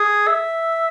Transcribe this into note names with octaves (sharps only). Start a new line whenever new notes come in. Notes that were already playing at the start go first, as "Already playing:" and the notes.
Already playing: G#4
E5